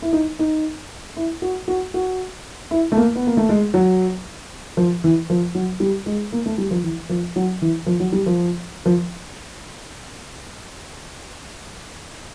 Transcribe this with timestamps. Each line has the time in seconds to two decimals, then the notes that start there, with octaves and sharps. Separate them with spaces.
0.02 E4
0.13 D#4
0.39 D#4
1.17 E4
1.42 F#4
1.68 F#4
1.94 F#4
2.71 E4
2.92 A3
2.97 A#3
3.16 B3
3.27 A#3
3.37 A3
3.49 G#3
3.74 F#3
4.77 F3
5.04 E3
5.30 F3
5.55 F#3
5.80 G3
6.06 G#3
6.33 A#3
6.46 A3
6.58 G3
6.71 F3
6.83 E3
7.09 F3
7.36 F#3
7.62 E3
7.86 F3
8.00 F#3
8.13 G3
8.26 F3
8.86 F3